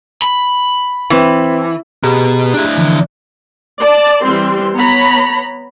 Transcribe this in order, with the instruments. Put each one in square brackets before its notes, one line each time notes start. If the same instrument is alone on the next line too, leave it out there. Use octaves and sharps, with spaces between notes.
[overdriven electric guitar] B5
[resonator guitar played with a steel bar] E3 [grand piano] C4 B4
[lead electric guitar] B2 [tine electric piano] G4 G#4 A#5
[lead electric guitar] D4 E4
[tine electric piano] D3 E3 F3
[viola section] D5 A5
E3 G3 C4 C6
B3 C#5 A#5 B5